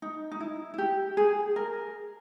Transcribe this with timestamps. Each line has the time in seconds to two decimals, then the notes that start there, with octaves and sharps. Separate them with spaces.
0.02 D#4
0.32 D#4
0.40 E4
0.74 E4
0.78 G4
1.17 G#4
1.56 A#4